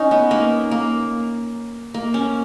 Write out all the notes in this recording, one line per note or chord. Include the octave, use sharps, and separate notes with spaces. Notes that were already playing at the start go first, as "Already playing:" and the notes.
Already playing: C#4 D#4
B3
A#3
A#3
A#3
C#4